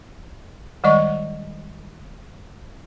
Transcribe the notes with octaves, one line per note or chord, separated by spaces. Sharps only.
D#3 G3 G#3 D5 D#5 C#6